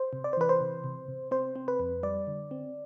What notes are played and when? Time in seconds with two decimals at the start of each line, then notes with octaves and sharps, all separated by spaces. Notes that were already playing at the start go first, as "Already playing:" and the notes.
Already playing: C5
0.13 C3
0.24 D5
0.33 C5
0.37 E3 B4
0.49 C5
0.60 C3
0.84 C3
1.08 C3
1.31 C4 C5
1.56 C4
1.68 B4
1.80 F2
2.03 G3 D5
2.27 D3
2.51 C4